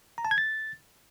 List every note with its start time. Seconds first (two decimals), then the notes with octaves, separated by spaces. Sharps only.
0.18 A#5
0.25 A5
0.31 G#6
0.38 A6